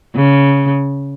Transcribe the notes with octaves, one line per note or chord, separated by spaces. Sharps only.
C#3